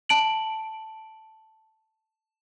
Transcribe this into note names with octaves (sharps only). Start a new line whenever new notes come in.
A5 D7 F#7